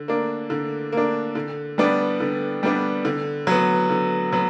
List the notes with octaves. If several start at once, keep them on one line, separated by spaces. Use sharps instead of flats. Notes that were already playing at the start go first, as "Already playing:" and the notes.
Already playing: D3
A#3 D4
D3
A#3 D4
D3
G3 B3 D4
D3
G3 B3 D4
D3
F#3 B3
D3
F#3 B3